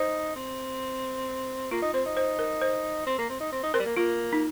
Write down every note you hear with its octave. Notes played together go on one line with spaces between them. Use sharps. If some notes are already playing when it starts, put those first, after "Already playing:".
Already playing: D#4 C5
C4
A#3 F4
D#4
C4 C5
D#4
C5
A#4
C5
C4
A#3
C4
D#4
C4
D#4
C4 A#4
G3
A#3
A#3 F4
D#4